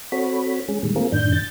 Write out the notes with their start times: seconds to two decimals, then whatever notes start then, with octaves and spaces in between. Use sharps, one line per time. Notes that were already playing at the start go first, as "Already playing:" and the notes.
0.12 C4 F#4 A4 C#5 B5
0.68 G#3 C#4 G#4
0.83 A#2 D#3 G3 G#3
0.96 A3 A#3 C4 F4 G#4 A#4
1.12 F#2 A2 D#3 D4 G6
1.32 G6 A6